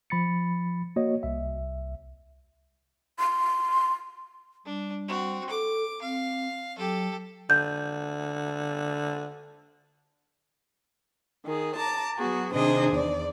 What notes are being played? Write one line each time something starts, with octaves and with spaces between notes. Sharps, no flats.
F3 B5 A6 C#7
A#3 F#4 C#5 D#5
C2 E5
C6
G3 D4
C4 F#4
A4 D6
C4 F5
F#3 G4 A4
D3 G6
D#3 G#4
A5 A#5 D6
F#3 B3 F#4 G#4
C3 D#3 D4 G#4 C5 D#5
E2 D5